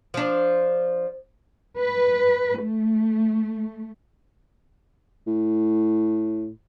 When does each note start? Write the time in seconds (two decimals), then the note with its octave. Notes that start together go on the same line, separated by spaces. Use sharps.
0.14 F3 D4
1.77 B4
2.61 A3
5.27 A2